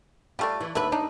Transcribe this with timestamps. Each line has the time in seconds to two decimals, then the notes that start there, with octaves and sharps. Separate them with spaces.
0.39 G3 A3 F4 D5
0.61 E3
0.75 D#2 D3 B4 E5
0.92 D4 D#4